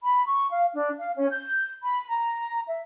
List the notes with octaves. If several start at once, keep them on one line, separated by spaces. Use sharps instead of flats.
B5
C#6
F5
D4
F5
C#4
G6
B5
A#5
E5